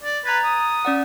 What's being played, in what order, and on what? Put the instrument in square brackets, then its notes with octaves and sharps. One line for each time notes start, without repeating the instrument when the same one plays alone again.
[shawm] D5
[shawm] B4 [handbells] A#5 G#6 A6
[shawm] D#6
[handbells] C#4 D5 F#5